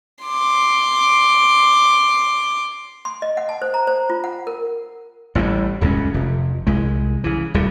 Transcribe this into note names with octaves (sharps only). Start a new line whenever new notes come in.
C6 D6
C6
D#5
F#5
A5
C5
A#5
C5
F4
F#5
A#4
A1 A2 D#3 G3
D#1 C#2 F#2 C#4
F1
C2 G#3
C#3 E3
D1 C2 C3 G3